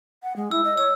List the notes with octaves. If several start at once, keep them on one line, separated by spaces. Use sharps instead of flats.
F#5
G#3
E4 E6
D#5
C#5 E6